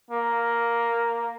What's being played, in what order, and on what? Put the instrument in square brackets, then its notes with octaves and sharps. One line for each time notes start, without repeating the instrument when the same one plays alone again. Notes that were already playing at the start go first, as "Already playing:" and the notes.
[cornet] A#3